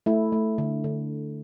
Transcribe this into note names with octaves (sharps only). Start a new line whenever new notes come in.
A3 E4
A3
D3
D3